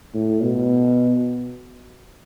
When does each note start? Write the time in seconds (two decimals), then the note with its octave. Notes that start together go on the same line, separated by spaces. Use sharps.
0.14 A2
0.42 B2